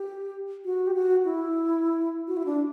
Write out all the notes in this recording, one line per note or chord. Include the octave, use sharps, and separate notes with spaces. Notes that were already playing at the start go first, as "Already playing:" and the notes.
Already playing: G4
F#4
G4
F#4
E4
F#4
E4
D4